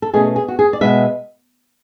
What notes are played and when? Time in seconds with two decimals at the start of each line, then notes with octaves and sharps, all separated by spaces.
0.02 A4
0.14 B2 A3 C#4 G#4
0.36 G#4
0.48 F#4
0.59 G#4
0.73 D5
0.81 B2 G#3 B3 E5